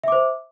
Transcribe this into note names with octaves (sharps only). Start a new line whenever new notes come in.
C5 E5 D6